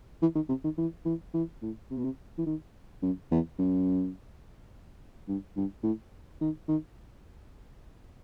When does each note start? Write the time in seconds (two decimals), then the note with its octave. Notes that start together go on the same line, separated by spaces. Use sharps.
0.22 E3
0.35 D#3
0.49 C3
0.64 D#3
0.78 E3
1.05 E3
1.34 E3
1.62 A2
1.91 C3
1.98 B2
2.04 C3
2.38 E3
2.46 D#3
3.02 F#2
3.31 E2
3.59 F#2
5.28 G2
5.56 G2
5.83 A2
6.41 D#3
6.68 D#3